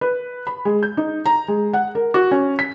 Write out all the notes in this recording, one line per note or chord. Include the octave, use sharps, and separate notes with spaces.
B4
B5
G#3
G6
D#4
A#5
G#3
F#5
A#4
F#4
C#4
B6